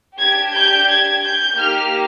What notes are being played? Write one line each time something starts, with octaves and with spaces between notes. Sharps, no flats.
D4 G4 G#6
G6
G#6
G6
A#3 D#4 G4 F6